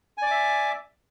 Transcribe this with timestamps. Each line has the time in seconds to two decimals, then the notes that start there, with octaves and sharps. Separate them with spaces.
0.17 G#5
0.22 D5
0.27 D6
0.31 E5